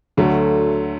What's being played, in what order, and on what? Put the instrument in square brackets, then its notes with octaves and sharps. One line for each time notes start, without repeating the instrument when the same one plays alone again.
[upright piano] D2 D3 F#3 A3